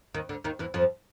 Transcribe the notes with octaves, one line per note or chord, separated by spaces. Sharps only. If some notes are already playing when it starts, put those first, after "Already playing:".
D#2 D#3
D2 D3
D#2 D#3
E2 E3
F2 F3